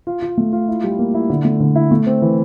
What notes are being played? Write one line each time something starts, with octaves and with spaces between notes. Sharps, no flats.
F4
F4
A3
F4
E4
G3
A#3
E4
D3
A3
D3
E4
A3
C4
E3